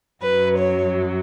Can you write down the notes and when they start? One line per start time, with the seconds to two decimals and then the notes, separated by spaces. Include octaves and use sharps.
0.22 F#2 F#3 B4
0.58 C#5